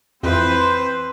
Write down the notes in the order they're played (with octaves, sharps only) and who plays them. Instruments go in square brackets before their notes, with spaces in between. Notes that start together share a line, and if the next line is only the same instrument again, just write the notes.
[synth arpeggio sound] F2 E3 [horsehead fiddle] C4 C5 [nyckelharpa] B4